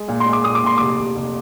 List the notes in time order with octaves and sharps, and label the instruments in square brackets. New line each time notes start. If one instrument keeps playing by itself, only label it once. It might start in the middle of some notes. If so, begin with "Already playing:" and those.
Already playing: [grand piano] G#3
A#2
C6
G#3
D6
A#2 D#6
D6
A#2 C6
F1 D6
F1
F1